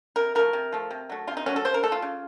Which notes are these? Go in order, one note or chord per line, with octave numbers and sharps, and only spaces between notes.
C3 A#4
F3 A3 A#4
C3
F3 A3
C3
F#3 A3
C3 F4
D#4
F#3 A3 C#4
A4
C#3 C5
A#4
A3 A4
F4
C#3